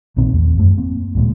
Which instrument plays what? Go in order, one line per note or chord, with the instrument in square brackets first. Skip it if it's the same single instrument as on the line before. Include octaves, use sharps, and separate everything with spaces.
[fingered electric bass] A#1 A#2 D#3 C4
E2 A3
F#2 A3
A#3 C4
D1 C#2 A#2 G#3